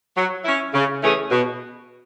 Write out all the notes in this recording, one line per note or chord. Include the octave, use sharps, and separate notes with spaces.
F#3
C#4 E4
C#3
E3 A3 C#4 G#4
B2